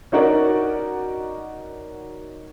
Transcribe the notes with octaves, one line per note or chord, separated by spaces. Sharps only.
C#4 D#4 F#4 A#4 D5